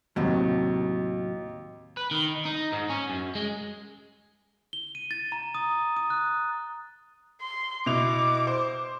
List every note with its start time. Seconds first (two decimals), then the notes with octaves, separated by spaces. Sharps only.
0.16 D#2 A2 C3 F#3
1.97 B4
2.11 D#3
2.45 D#4
2.73 G#2
2.90 C#4
3.10 F#2
3.35 G#3
4.73 G7
4.95 D#7
5.11 A6
5.32 A#5
5.55 D#6
5.96 D#6
6.10 F#6
7.41 C6
7.86 B2 E4 D6 F7
8.47 C5